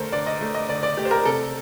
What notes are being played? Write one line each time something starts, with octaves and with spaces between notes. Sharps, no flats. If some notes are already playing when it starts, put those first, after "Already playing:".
Already playing: D3 A3 A4 A#4 C5
D3 D5
D#5
A3
D#5
D3 D5
D5
A3 G4
C5
A#4
C3 A4